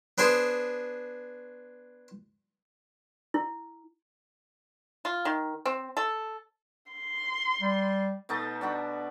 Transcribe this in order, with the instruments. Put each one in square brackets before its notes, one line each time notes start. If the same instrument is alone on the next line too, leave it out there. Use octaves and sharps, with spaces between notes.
[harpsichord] B3 D4 G#4 C5
[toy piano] E4
[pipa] F4
D#3
C4
A4
[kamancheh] C6
[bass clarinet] G3
[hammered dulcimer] B2 A3 D#4 A5
D4 F#4 B5